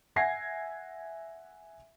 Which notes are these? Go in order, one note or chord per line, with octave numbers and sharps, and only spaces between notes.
E5 F#5 G#5 G#6 A#6 C7